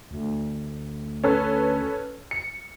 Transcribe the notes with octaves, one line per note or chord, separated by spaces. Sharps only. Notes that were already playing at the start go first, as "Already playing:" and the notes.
D2
C#4 A4 B4
C#7